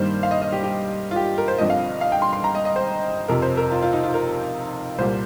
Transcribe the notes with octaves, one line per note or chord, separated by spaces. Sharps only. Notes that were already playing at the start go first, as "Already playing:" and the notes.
Already playing: G2 D#3 G3 A#3 C5
F5
D#5
D#5
G4
G4
F4
G4
A#4
C5
G1 G2 F3 C4 D#5
F5
F5
G5
C6
C6
A#5
D#5
D#5
C5
F2 C3 F3 A#4
C5
A#4
F4
F4
D#4
F4
A#4
C2 A#2 G3 A#3 C5